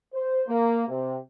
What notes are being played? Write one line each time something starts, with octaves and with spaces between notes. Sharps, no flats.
C5
A#3
C3